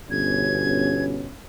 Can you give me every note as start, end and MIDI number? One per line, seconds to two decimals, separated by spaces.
0.11 1.27 31
0.11 1.35 47
0.11 1.35 61
0.11 1.04 92